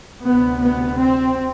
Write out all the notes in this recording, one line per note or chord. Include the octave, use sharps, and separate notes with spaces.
D2 C3 B3
B3
C4